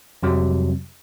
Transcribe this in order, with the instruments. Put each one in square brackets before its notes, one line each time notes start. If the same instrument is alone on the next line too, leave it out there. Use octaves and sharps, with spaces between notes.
[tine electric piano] F2 C3 F#3 G3